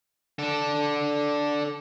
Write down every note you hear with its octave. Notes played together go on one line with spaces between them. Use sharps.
D4 A4